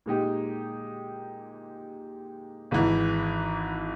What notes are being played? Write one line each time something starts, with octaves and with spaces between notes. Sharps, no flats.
A#2 G#3 D#4 G4
G#1 G#2 E3